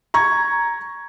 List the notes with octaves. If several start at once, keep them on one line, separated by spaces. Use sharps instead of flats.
A#5 C#6 G#6